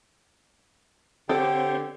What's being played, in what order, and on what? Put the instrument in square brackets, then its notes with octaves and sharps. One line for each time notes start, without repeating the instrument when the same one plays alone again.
[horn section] D3 G4 [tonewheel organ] C4 C5 C#5 [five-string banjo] A4